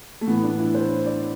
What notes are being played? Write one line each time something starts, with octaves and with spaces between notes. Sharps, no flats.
A3
A2 E3 B3
D4
E4
C5
D5